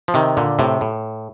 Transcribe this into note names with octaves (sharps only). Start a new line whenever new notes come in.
F3
C3 D#3
A#2 D3
A2 C3
A2